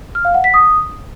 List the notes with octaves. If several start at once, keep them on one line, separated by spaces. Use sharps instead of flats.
F6
F5
F#5
B6
D#6